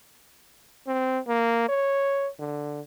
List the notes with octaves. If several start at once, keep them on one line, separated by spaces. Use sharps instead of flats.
C4
A#3
C#5
D3